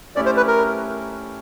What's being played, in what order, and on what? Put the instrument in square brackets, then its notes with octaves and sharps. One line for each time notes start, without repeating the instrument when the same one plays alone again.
[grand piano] A3 C#4 E4 G4 [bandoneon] D5
[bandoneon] C5
B4
A#4